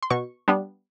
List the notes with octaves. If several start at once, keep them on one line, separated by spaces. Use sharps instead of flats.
C6
B2 C#6
G3 B3 D4